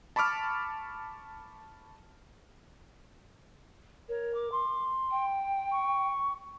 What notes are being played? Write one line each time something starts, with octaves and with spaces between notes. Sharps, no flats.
A5 B5 C#6 D6 F6
A#4 C#5
D6
C6
G5
C#6